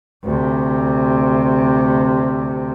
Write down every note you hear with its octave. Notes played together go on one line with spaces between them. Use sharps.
D2 C3